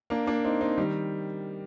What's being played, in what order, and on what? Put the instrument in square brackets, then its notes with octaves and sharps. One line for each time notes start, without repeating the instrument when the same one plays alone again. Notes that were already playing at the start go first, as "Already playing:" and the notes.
[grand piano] A#3 D4
A#3 D4
C4 D#4
C4 D#4
D#3 G3